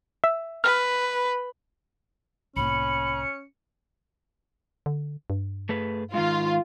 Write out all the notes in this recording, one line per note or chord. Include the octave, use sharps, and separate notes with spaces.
E5
B4 F6
C2 A2 A#3 C#4 B5 C#7
D3
G2
A3 G#4 B4
G#2 D#3 F4